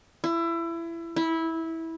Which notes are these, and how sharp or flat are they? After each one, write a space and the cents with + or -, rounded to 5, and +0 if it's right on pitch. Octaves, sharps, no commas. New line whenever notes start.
E4 +25
E4 -15